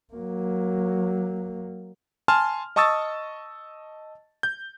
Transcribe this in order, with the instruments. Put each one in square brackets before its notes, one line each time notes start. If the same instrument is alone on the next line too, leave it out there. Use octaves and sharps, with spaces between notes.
[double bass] F#3 A#3
[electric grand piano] G#5 A5 C6 F6
D#5 A5 C#6 D#6 E6 A6
G6